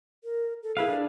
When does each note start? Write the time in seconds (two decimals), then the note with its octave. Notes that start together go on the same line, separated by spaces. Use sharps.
0.24 A#4
0.63 A4
0.77 E4 G#4 B4 F5
0.88 D4